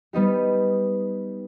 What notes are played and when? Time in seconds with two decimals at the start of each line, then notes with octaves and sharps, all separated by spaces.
0.13 G3 B3 D#4 G4